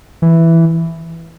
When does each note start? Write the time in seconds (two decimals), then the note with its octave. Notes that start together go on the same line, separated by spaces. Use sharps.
0.22 E3